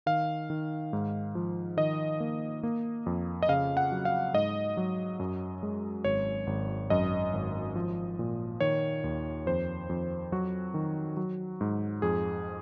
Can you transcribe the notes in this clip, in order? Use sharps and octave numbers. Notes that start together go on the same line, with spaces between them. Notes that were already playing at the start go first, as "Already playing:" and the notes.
D#3 F5
D#3
G#2
F3
D#3 D#5
A#3
A#3
F2
D#5
C#3 F5
F#5
F#3
F5
G#2 D#5
F#3
F#2
G#3
G#1 C#5
G#1
F#2 D#5
G#1
F3
A#2
D#3 C#5
D#2
F2 C5
F2
F#3 F#4
D#3
F#3
G#2
F2 G#4